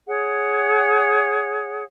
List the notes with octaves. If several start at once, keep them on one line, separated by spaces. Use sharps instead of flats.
G#4 C#5 F#5